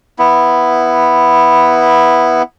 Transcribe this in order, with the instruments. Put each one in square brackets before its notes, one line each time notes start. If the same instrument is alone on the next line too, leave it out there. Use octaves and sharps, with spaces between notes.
[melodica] B3 E4